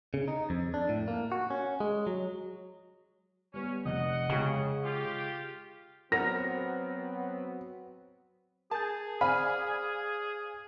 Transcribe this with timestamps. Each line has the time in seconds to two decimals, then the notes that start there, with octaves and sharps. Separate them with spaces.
0.14 C#3
0.28 D#4
0.50 F2
0.74 D4
0.89 A2
1.08 A#3
1.32 F#4
1.50 C#4
1.80 G#3
2.07 F#3
3.54 G3 B3 C#4
3.85 F1 D#5 F#5
4.30 C#3 G#3 G5 C#6
4.84 F4 G4
6.12 F#3 B3 C4 A#4 F#5 A#6
8.71 G#4 A#4 G#5 A5 G6
9.21 C5 D5 F5 G#5 B5 F6